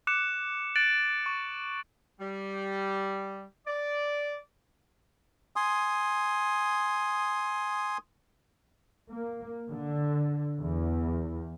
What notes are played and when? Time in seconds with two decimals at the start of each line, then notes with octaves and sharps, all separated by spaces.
0.07 D6 F#6 C#7 E7
0.76 F#6 A6 D7 F#7
1.26 C#6
2.20 G3
3.67 D5
5.56 G#5 C6 D#6
9.11 A#3
9.72 D3
10.61 E2